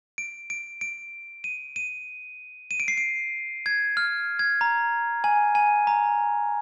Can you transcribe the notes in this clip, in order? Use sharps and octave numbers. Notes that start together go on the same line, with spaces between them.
D7
D7
D7
D#7
D#7
D#7
D7
C7
D7
G#6
F6
G#6
A#5
G#5
G#5
A#5